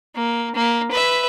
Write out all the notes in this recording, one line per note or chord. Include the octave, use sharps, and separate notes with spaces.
A#3
A#3
B4 E5